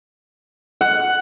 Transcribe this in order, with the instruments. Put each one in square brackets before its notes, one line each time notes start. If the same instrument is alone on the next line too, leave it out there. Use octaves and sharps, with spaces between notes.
[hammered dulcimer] F#5